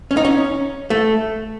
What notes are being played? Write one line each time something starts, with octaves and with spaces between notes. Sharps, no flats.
C#4
D#4
C#4
A3